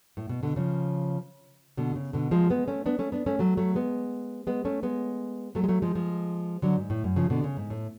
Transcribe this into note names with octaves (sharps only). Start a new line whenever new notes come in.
A2
B2
B2 D3
C#3 F3
B2 D3
C#3
B2 D3
F3 G#3
G#3 B3
A3 C#4
B3 D4
A3 C#4
B3 D4
A3 C#4
F#3 A3
F#3 A3
G#3 B3
G#3 B3
A3 C#4
G#3 B3
F#3 A3
G#3
F#3 A3
F3 G#3
F3 G#3
D3 F#3
G#2
A2
F#2
C#3 F3
B2 D3
C#3
G#2
A2